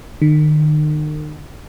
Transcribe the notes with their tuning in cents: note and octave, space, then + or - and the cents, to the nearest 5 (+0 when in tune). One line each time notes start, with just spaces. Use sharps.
D#3 -40